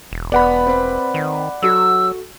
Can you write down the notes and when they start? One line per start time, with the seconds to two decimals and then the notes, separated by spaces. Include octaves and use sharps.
0.12 E1
0.32 E1 B3 D5 F#5 B5
0.67 C4 B4
1.14 D#3
1.63 F#3 F#4 A4 E6